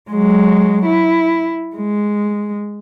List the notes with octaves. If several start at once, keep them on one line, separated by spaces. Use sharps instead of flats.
F#3 G#3
E4
G#3